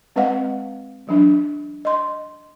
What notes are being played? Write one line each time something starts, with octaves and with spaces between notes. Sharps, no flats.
G#3 C4 B4 D#5 F5 F#5
E3 F#3 D4
D#5 C6